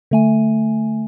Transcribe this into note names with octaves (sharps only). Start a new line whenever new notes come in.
D3 A3 G#5